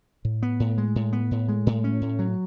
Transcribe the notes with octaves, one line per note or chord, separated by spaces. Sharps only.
A2
B3
A2
G#3
A2
B3
A2
G#3
A2
C#4
A2
F#3